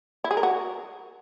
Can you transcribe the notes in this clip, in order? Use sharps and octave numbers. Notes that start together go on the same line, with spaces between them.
E4
G#4
A#4
F#4